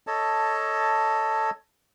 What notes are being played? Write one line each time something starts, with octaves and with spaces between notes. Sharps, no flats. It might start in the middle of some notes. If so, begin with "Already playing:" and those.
A4 C#5 D#5 A5